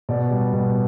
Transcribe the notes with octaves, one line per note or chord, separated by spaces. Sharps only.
B2 D5
G3
B2